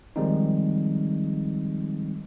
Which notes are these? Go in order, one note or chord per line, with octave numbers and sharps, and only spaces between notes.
D#3 F3 G3 G#3 C4 D#4